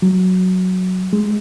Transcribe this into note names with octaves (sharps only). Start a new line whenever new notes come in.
F#3
G#3